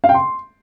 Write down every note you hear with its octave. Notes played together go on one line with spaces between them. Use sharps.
F5
G5
C6